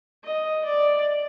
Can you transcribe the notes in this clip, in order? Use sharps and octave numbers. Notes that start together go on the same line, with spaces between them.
D#5
D5